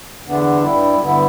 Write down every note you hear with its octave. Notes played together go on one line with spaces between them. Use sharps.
E2 D3 B3 D4
G2 G3 E4
G2 D3 B3 E4